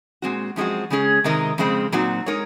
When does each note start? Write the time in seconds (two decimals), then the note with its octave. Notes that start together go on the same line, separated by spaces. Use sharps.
0.22 A#2 G#3 C4 F#4
0.56 F#2 F3 G#3 C4 F#4
0.90 C#3 G#3 C#4 G#4
1.24 C3 D#3 G#3 D#4 A#4
1.58 F2 C#3 G#3 C4
1.92 A#2 F#3 C4 D#4 F#4
2.26 G#3 D#4 A#4 C#5